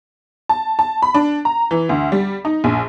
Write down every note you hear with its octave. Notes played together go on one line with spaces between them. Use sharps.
A5
A5
B5
D4
A#5
E3
D2
G3
D#4
A#1